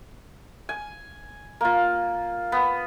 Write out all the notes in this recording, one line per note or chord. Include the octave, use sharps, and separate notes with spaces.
G#5
A#3 F4
B3